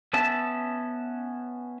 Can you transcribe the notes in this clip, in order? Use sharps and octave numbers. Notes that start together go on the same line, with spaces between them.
B3 C#4 E5 A5